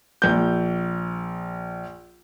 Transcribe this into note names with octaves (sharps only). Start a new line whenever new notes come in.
A#1 G6